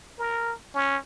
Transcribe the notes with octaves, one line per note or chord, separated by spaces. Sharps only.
A#4
C#4